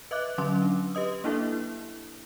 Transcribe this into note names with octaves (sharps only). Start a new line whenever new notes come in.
B4 D#5 E5 D6 F#6
D3 F#3 C#4 C6 D6
D4
G4 B4 D#5 D#6
A#3 D4 E4 A4 E5
E4